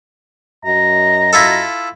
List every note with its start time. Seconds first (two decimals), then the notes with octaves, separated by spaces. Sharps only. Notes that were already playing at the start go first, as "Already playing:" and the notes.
0.65 F#2 F#4 D#5 A#5
1.33 E4 F4 A4